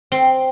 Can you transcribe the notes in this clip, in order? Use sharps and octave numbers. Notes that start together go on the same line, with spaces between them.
C4